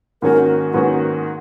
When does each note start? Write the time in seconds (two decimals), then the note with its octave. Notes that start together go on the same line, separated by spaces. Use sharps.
0.22 G#2 D#3 A#3 C#4 F#4 A#4
0.73 G#2 D#3 A#3 C#4 F#4 B4